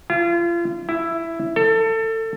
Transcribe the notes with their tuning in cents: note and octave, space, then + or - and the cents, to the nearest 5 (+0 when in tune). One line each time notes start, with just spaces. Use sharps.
F4 -35
E4 +10
A4 +25